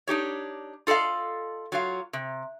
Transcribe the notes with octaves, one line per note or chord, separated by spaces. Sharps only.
D4 D#4 G4 C#5
F4 A4 D5 D#5 F5
F#3 F4 F5
C3